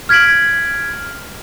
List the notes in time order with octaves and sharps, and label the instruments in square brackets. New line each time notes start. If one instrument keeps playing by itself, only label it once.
[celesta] F6 G#6 B6 D7 F#7